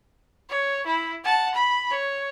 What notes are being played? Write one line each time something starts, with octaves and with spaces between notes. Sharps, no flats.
C#5
E4
F#5 A5
B5
C#5